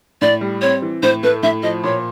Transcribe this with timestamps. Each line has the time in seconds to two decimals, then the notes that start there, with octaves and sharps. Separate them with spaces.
0.21 A2 D5
0.41 G3
0.62 C4 C#5
0.82 E3
1.03 A2 C5
1.23 A3 B4
1.43 A2 E5
1.63 F3 D#5
1.84 A#2 C#5